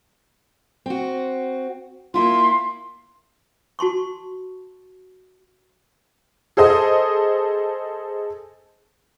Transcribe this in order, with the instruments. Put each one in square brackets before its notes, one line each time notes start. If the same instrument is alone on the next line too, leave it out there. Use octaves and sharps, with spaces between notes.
[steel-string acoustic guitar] C4 F#4
[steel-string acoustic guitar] A#3 E4 F4 [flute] C6
[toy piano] F#4 A5 C6 C#6
[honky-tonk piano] G#4 A4 C5 D#5 D#6